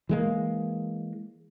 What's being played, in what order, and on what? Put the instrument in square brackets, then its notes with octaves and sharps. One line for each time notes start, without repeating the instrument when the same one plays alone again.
[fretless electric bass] E3 G#3 A#3